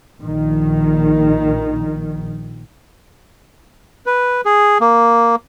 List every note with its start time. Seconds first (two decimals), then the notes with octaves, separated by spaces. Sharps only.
0.21 A#1 D#3
4.06 B4
4.45 G#4
4.81 A#3